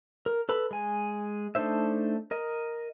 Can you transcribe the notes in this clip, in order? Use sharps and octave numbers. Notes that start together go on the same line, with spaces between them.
A#4
A4 B4 B5
G#3 G#5
A3 D4 D#4 C5 E5
A#4 D#5